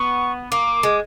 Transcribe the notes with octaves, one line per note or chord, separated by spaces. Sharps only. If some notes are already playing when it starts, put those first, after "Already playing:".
Already playing: B3 C#6
A#3 D6
G#3